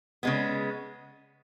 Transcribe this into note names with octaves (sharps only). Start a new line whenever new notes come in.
C#3 G#3 B3